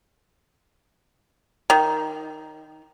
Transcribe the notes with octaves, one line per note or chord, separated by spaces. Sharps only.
D#3